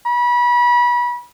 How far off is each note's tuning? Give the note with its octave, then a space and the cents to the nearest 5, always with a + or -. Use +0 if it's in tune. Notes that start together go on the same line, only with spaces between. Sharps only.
B5 -30